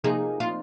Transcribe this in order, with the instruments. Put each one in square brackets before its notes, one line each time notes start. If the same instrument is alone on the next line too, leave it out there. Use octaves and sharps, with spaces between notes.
[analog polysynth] C3 F3 A#3 D#4 [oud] G#4
[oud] F4